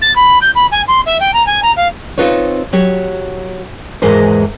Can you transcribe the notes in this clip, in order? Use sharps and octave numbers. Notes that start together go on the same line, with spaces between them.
A6
B5
G6
B5
G#5
C6
E5
G5
A#5
G#5
A#5
F5
C4 D#4 F4 B4 C#5
F#3 G4 C#5
E2 G#2 E3 G#3 A#4 C5